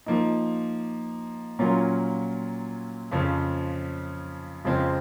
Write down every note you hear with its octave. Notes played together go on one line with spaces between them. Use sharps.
F3 A#3 D#4
A#2 F#3 C#4 F4 A#4
F2 C#3 F3
F2 C#3 F3 G#3 C4